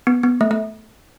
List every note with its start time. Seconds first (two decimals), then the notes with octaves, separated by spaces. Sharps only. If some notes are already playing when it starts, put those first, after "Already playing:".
0.07 B3
0.23 B3
0.41 A3
0.51 A3